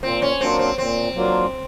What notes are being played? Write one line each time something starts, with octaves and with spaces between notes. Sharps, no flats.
A#2 C4
C#4
F#3 A#3 C4 D4 F4
C4
A#2 C4
F#3 A#3 D4 F4